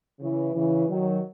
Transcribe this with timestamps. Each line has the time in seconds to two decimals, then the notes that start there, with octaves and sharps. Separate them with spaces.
0.20 C#3 E3
0.54 C#3 E3
0.88 D#3 F#3